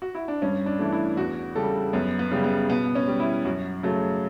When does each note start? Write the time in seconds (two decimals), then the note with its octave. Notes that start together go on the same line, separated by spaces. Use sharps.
0.02 F#4
0.15 E4
0.28 D4
0.42 G2 C#4
0.66 D4
0.79 E3 A3
0.93 E4
1.17 E2 F#4
1.55 C#3 G3 A4
1.93 F#2 B3
2.19 B3
2.31 C#3 G3
2.44 B3
2.70 B2 B3
2.95 C#4
3.08 G3
3.20 E4
3.45 F#2 F#4
3.83 C#3 F#3 A3